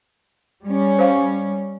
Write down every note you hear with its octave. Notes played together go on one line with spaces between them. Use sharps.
G3 C#4
C5 F5 C#6